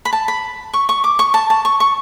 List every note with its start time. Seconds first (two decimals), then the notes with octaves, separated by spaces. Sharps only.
0.05 B5
0.13 A5
0.28 B5
0.73 C#6
0.89 C#6
1.04 D6
1.19 C#6
1.34 A5
1.50 A5
1.65 C#6
1.80 C#6